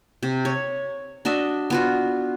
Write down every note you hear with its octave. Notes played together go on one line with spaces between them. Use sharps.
C3
C#5
D4 F#4 D#5 E5
B3 F4 F#4